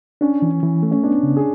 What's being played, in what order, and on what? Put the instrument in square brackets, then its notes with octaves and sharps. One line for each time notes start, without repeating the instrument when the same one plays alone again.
[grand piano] C#4 [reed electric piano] D4
[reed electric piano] E3
E3
A3
[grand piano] C#4
[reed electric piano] B3 [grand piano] D4
[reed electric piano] C#3
[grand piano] G#4